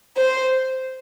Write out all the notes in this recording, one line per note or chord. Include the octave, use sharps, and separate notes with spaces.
C5